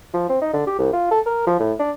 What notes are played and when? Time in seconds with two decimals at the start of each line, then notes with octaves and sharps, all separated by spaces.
0.14 F3
0.29 C4
0.42 D#4
0.53 D3
0.67 G4
0.79 C2
0.93 F4
1.11 A4
1.26 A#4
1.47 F3
1.60 A2
1.79 D4